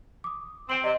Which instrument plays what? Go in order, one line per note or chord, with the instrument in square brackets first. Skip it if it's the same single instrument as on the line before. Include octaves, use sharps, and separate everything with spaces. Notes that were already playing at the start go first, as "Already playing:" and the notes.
[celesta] D6 D#6
[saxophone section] C4 [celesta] G5 F#7
[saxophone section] C3 [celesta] D5 D#5